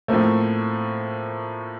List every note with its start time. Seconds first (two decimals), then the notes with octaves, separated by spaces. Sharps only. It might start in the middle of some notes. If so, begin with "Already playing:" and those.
0.08 A2 F3 A3 A#3 C4